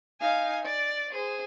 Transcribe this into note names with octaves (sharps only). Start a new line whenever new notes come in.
D#4 F5 G#5
D5
G#4 C5